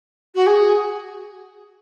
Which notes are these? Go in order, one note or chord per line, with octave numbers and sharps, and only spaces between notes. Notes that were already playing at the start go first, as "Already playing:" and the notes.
F#4
G#4